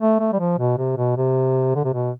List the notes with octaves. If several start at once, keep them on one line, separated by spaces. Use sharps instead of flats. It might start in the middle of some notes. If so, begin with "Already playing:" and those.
A3
A3
G3
F3
B2
C3
B2
C3
D3
C3
B2